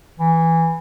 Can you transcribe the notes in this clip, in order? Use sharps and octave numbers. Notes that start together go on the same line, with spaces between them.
E3